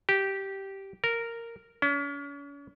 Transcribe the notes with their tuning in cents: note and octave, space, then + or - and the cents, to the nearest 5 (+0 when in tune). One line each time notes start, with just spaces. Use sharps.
G4 -10
A#4 -10
C#4 +40